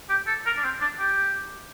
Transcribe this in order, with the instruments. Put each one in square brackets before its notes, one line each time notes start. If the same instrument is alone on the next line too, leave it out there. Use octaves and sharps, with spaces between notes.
[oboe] G4
A4
A#4
D4
C4
D4
G4